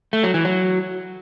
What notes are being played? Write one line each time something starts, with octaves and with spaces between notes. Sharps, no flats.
A3
F#3
E3
F#3